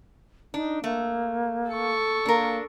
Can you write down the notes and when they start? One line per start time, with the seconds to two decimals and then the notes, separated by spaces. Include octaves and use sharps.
0.54 D4 D#4
0.84 A3 A#3
1.70 A4 C#6
2.26 A#3 D4 A#4